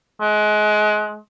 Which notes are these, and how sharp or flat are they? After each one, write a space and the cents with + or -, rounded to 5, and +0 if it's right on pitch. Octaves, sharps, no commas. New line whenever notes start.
G#3 +30